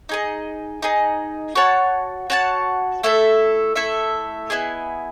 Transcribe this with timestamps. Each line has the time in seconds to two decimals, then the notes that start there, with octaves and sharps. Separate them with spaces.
0.09 D#4 G#4 D#5
0.82 D#4 G#4 D#5
1.55 F#4 C#5 F#5 A5
2.30 F#4 C#5 F#5 A5
3.03 A3 E4 A4 E5
3.76 A3 E4 A4 E5
4.50 B3 E4 G#4 D#5